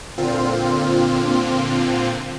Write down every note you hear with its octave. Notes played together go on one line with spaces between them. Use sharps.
A#2 D3 C4 F4